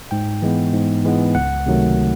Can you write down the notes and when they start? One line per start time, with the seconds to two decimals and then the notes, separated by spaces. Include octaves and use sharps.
0.11 G#2 G5
0.42 E3 G#3 B3
0.74 G#2
1.05 E3 G#3 B3
1.35 C#2 F#5
1.66 C3 D#3 F#3 A3